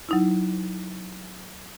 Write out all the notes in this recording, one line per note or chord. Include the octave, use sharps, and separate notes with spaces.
F#3 D#4 E4